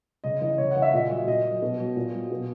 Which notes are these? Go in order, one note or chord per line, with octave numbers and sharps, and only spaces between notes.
C#3 D#5
E3 D#5
C#3 C#5
E3 F#5
E5
A#2 D#5
F#3
A#2 D#5
F#3
B2
F#3
A#2
F#3
B2